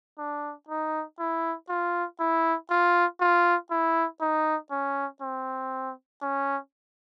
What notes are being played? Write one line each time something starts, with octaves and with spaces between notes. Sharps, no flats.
D4
D#4
E4
F4
E4
F4
F4
E4
D#4
C#4
C4
C#4